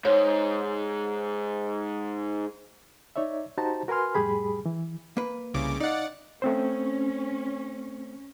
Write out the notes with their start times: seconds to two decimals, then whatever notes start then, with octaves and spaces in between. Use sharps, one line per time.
0.05 G#2 C#5
3.16 D#4 C#5 D5 E5
3.58 D#4 F#4 G4 C5 A5 A#5
3.88 F#4 A#4 B4 G#5 C6 F6
4.15 F2 A2 G3 G4 G#4 B5
4.66 E3
5.17 A#3 B4
5.54 C2 C#3 D6
5.80 D#4 D5 F5 F#5
6.42 A3 C4 C#4 C5